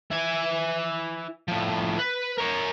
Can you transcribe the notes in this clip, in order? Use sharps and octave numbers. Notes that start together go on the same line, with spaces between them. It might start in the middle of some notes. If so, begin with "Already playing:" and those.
E4 G#5
A2 F3
B4
A#4 C#5